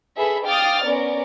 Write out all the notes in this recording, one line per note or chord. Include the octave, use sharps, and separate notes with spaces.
G#4 A4 B4 E5 B5
F5 G5 D6 D#6 F6 A6
B3 C#4 A#4 D5